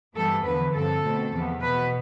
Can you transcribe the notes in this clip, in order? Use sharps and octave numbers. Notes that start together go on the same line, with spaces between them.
G2 E3 G3 B3 A4
E2 D3 F3 B4
G2 F3 C4 A4
B2 A3 C4
E2 C3 F3 B3
B2 B3 B4